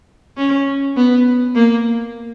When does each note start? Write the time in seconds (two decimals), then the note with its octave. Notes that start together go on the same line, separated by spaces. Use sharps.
0.37 C#4
0.96 B3
1.55 A#3